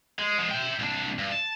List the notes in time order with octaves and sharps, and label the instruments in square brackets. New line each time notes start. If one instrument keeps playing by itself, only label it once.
[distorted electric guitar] G#3
F3 G#3
E5 G5
C2 D4
G2
A5